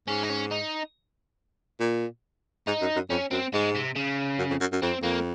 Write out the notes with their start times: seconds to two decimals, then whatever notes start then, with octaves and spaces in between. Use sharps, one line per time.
0.08 G#2 C#4
0.23 D#4
0.30 C#4
0.52 D#4
1.80 A#2
2.67 G#2 D#4
2.81 F#2
2.96 F#2
3.10 F2 C#4
3.31 F#2 C4
3.53 G#2 G#3
3.75 C3
3.96 C#3
4.39 F#2
4.50 F2
4.60 F#2
4.72 F#2
4.82 F2 C4
5.02 F2 A#3